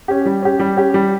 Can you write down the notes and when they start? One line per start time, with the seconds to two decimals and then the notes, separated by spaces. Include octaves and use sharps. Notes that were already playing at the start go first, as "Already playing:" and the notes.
0.08 C#4 G4
0.26 G3
0.42 C#4 G4
0.59 G3
0.77 C#4 G4
0.94 G3